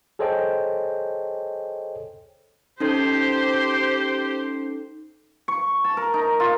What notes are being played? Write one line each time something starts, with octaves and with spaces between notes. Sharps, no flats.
G#4 A4 C5 C#5 D#5 G5
C#4 D#4 G4 A4 C5
C#6
A5
A#4
D#4
F4